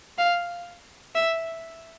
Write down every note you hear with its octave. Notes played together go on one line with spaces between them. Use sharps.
F5
E5